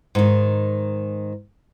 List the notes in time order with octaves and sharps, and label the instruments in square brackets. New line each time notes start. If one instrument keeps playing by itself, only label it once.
[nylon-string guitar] G#2 D#3